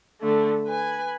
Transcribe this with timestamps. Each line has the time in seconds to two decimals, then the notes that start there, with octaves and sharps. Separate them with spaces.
0.21 D3 A3
0.66 B4 G#5